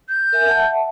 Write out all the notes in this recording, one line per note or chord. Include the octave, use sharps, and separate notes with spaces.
G6
A#4 E5 G#5
E5 F#5 A5